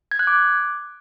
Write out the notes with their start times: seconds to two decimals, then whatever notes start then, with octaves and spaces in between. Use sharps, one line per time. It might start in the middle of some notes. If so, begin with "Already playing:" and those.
0.11 G#6
0.19 F#6
0.27 D6